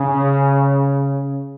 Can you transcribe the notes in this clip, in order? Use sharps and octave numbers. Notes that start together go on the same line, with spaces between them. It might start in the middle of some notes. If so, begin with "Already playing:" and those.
Already playing: C#3